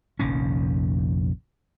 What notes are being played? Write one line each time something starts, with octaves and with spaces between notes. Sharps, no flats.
F1 A#1 D#3 C#4